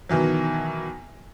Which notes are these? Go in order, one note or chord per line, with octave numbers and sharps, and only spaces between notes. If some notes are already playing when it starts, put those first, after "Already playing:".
B2 D#3 E3 F#3